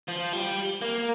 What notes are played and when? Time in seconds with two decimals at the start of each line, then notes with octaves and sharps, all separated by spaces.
0.08 F3
0.33 G3
0.81 A#3